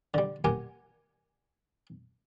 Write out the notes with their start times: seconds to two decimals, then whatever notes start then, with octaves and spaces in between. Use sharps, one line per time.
0.14 D3 G3
0.44 G4 A#4 F#5 G#5